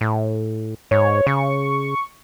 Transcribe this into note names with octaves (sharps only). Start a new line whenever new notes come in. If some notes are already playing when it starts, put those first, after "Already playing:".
A2
G#2 C#5
C#3 C#6